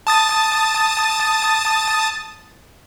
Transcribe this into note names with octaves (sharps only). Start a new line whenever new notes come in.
A5 D#6 A6